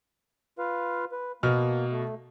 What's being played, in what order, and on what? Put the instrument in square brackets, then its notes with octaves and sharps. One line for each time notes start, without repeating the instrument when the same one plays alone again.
[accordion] F4 B4 F5
B4
[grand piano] B2 F6 [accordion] A#3
[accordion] A3